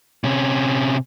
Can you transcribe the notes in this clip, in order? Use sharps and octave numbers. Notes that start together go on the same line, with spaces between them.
C3 C#4